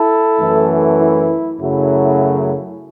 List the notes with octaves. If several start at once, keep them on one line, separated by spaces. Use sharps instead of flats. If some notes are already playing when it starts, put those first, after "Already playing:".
Already playing: E4 A4
F#2 E3 A3
E4
F#2 C#3 F#3 A3 E4